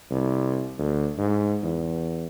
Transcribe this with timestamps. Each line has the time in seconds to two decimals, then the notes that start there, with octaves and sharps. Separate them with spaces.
0.11 C2
0.79 D2
1.18 G#2
1.62 E2